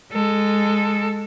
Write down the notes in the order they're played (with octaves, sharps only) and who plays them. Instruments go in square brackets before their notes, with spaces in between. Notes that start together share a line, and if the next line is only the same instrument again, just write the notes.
[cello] G#3 A4